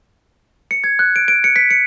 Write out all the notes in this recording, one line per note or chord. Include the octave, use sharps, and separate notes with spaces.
C#7
G#6
F#6
D7
D7
C#7
B6
C#7